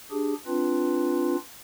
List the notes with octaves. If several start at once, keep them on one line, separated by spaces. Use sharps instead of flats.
D4 G4 G#4
C4 D4 F4 B4